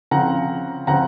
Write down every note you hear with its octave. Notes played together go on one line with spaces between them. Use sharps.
C#3 F3 C4 F#5 A#5
C#3 F3 C4 F#5 A#5